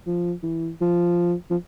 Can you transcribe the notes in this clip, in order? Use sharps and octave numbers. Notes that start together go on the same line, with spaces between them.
F3
E3
F3
F3